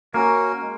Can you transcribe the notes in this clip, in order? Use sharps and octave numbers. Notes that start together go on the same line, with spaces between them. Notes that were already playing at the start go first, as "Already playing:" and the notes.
A#3 C#4 F#4 A#4
G#3